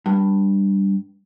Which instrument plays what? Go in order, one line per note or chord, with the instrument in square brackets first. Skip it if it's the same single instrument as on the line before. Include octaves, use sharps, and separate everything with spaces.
[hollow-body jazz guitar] G2